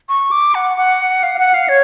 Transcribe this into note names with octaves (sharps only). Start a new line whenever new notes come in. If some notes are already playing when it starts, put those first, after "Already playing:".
C#6
D6
F#5
F#5
F5
F5
F#5
F5
C#5